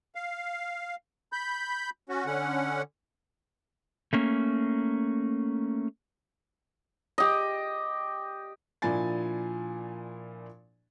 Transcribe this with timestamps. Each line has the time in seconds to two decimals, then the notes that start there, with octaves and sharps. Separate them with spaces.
0.15 F5
1.32 B5 G6
2.09 C#4 F#4
2.26 D3 C#4 F#5
4.13 A3 A#3 C#4
7.18 G4 D#5
8.82 A#2 F3 D4 E4 G#5 A6